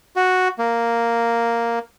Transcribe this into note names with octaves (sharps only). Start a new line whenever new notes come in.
F#4
A#3